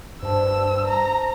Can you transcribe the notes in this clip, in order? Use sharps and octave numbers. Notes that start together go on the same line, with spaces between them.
G2 C5 A5 E6
A#5